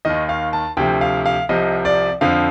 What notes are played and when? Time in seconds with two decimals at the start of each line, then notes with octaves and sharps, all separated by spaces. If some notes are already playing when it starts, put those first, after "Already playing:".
0.05 D#2 D#3 D#5
0.29 F5
0.53 A5
0.77 D2 C3 F3 G5
1.01 F5
1.26 F5
1.49 C2 C3 F3 D#5
1.85 D5
2.21 F2 D3 F3 F5